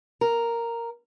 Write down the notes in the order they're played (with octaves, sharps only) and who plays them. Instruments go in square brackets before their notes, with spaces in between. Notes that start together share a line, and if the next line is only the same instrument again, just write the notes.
[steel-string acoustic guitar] A#4